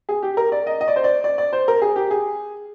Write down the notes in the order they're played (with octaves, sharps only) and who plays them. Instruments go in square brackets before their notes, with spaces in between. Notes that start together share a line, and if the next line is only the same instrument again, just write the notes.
[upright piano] G#4
G4
A#4
D5
D#5
D#5
D5
C5
D5
D5
D5
C5
A#4
G#4
G4
G#4